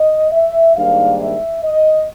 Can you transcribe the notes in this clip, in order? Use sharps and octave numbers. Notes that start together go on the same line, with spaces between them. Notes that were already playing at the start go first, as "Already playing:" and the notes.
Already playing: D#5
E5
G#2 D#3 G3 A#3 D4 F5
E5
D#5